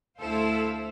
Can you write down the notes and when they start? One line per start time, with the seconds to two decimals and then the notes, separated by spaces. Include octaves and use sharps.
0.18 D2 E4 A4 C5 F5